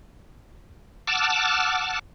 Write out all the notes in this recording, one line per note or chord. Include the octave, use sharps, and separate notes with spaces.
F#5 A5 D6 E6 F6